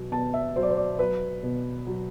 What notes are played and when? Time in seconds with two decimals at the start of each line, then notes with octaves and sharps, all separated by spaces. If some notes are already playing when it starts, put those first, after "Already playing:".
Already playing: B2 F#3
0.12 B2 A5
0.34 E5
0.56 F#3 C5
0.63 D5
0.70 C5
0.77 D5
0.99 F#3 B4
1.43 B2
1.87 F#3